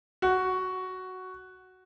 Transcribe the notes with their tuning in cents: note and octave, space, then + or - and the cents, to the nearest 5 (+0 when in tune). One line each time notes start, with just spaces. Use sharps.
F#4 +5